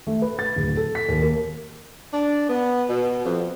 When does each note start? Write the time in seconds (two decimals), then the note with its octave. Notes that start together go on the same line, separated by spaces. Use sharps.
0.07 A3
0.22 B4
0.39 A6
0.56 D1
0.77 A4
0.95 B6
1.08 D#2
1.22 A#3
2.14 D4
2.49 B3
2.90 B2
3.26 F2